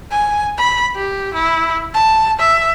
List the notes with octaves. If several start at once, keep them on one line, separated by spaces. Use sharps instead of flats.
G#5
B5
G4
E4
A5
E5